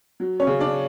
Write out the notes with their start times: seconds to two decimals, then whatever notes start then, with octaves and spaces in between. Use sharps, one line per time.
0.20 F#3
0.40 C#4 C#5
0.47 C#3
0.60 D4 D5